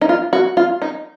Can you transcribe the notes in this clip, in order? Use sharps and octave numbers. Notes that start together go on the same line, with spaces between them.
D#4
F4
F#4
F4
D#4